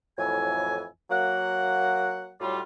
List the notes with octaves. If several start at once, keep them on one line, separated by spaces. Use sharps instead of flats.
F2 A2 E3 F#3 E5 G#5
F#3 A#3 F#5
A2 F#3 G3 F4